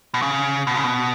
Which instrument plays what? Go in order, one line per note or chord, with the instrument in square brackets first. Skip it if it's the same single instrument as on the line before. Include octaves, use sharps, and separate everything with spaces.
[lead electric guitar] B2
C#3
B2
C#3
B2